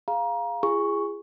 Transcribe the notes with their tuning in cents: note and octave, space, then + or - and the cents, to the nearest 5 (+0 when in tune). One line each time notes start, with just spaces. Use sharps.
G#4 +0 F5 +0 A#5 +25
F4 -45 G#4 -15 C#6 +0